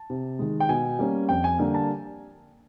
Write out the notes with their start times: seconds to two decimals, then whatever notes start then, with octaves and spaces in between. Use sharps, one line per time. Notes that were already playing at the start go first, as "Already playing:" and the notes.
Already playing: A5
0.10 C3
0.39 D#3 G#3
0.60 G5
0.69 B2 G#5
0.99 G3 A#3 C#4
1.29 F2 G5
1.44 G#5
1.59 D3 G3 A#3
1.74 A5